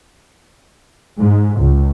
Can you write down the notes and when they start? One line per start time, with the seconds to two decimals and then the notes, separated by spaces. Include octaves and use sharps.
1.19 G#2
1.60 C#2